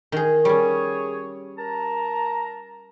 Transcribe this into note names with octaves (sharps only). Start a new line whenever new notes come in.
D#3 G#4
G3 C#4 G#4 C#5
A#4 A5 A#5